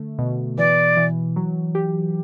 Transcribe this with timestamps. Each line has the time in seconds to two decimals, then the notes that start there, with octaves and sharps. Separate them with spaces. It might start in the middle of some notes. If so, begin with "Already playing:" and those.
Already playing: D3 A3
0.19 B2
0.58 E3 D5
0.97 E3
1.36 F#3
1.75 G4